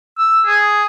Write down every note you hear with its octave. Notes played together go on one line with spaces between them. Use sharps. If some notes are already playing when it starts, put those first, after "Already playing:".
E6
G#4